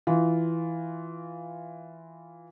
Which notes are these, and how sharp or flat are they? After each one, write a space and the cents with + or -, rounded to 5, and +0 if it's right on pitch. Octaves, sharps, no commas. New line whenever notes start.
E3 +0 F4 +0